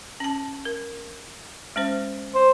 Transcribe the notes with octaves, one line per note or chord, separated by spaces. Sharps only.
C#4 A5
A#4
G#3 C#4 C5
C5